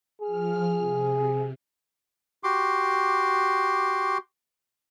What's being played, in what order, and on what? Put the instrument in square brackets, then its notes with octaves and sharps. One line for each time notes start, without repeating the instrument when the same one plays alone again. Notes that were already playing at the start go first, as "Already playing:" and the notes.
[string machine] F3 F6 [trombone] G#4
[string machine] C3
[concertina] F#4 G4 C6 D6